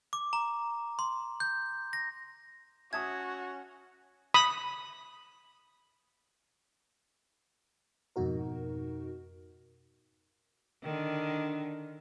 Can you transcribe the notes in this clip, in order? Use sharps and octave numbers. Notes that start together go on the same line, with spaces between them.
D6
A#5
C6
G6
A#6
C#4 F#4 E5 A5 D#6 G#6
B5 D#6
F2 G#2 B2 D#4 F#4 A#4
D3 D#3